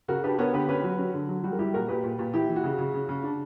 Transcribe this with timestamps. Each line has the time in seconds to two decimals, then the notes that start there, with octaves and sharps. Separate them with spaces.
0.08 C#3 F#4 A#4
0.23 D4 G4 B4
0.38 B3 A#4 C#5
0.53 D3 G4 B4
0.69 C#4 G4 B4
0.83 F#3 F#4
0.99 C#4
1.14 D3
1.28 F#3
1.43 G3 F#4
1.52 A#4
1.59 G3 E4 G4
1.73 A#2 F#4 A#4
1.88 A#2 G4 B4
2.03 A#2
2.19 A#2
2.34 E3 E4 G4
2.49 E3
2.56 F#4
2.64 C#3
2.78 C#3
2.94 C#3
3.09 C#3
3.23 D4